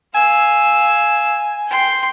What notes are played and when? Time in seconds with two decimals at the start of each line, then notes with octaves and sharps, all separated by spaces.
0.15 F5 G#5 E6
1.69 G5 C6